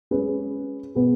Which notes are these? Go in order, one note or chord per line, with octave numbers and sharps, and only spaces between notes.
G#3 C#4 G#4 B4
B2 B3 G#4 B4